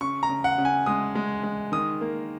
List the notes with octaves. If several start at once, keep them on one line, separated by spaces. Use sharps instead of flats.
C#3 C#6
A#5
C#3
F#5
C#3
G#5
G#3 D#6
G#3
G#3
D#3 D#6
A#3